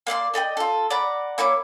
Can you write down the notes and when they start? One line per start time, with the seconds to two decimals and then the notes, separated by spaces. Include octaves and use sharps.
0.07 A#3 D5 E5 C6
0.34 A4 D5 D#5 G5
0.57 F4 A4
0.90 D5 F#5 A#5 B5
1.38 A#3 E4 C#5 D6